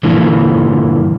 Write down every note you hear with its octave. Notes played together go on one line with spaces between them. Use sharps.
G2 A#2 D3 E3 F3